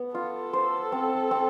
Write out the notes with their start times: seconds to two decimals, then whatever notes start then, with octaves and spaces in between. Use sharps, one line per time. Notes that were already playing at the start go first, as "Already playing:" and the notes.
Already playing: B3
0.14 F4 A4
0.53 C5
0.92 C4
1.31 C4